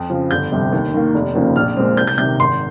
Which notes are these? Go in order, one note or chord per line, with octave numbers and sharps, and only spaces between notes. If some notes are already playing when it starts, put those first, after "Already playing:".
Already playing: F2
C#3 F3
G1 G6
F2 C3 G3
D#2
D#3 A#3
F1
D#2 C#3 F3 A#3
A#1 F6
A#2 G#3 C4
C2 G6
G6
C3 D#3 G6
G#1 C6